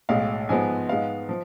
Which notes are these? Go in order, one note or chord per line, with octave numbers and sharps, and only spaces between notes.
B1 A2 G#3 F5
G#2 F3 G#3 B3 G#5
G#2 G#3 B3 F5
F3